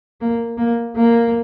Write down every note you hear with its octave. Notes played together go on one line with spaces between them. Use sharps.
A#3
A#3
A#3